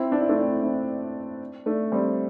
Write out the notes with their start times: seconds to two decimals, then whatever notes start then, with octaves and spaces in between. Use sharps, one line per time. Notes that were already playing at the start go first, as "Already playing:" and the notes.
Already playing: C4 E4
0.12 D4
0.21 E4
0.29 A3 D4
0.38 C4 E4
0.63 C4 E4
1.66 A3 D4
1.92 G3 C4